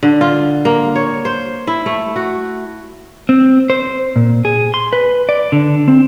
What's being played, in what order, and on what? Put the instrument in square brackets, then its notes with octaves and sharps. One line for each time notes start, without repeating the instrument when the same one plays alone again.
[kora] D3
F4
A#3
C#5
C5
E4
A3
F#4
[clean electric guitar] C4
C5
A#2
G#4
C6
B4
D5
D3
C4